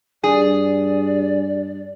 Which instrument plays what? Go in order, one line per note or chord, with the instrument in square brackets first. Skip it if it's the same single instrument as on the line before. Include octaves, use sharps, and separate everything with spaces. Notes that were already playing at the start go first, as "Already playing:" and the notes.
[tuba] G2 [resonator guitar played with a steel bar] G#4 [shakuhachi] D5